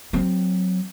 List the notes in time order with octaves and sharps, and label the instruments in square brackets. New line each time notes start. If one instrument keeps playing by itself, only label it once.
[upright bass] F#3 C4